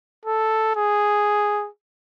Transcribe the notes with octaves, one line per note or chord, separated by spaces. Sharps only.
A4
G#4